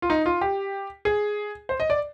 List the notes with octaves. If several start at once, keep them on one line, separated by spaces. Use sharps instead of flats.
F4
D#4
F4
G4
G#4
C5
D#5
D5